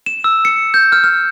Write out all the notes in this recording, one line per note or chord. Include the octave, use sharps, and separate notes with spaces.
E7
E6
C#7
G6
F6
F6